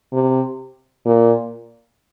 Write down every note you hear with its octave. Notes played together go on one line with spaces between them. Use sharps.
C3
A#2